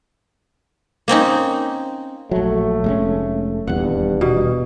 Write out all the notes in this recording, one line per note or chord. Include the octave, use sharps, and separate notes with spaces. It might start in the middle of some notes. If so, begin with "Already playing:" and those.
A#3 C4 C#4 D#4
A#1 F#3 A3
F1 G#3 C#4
D#1 E2 G2 F#5
B2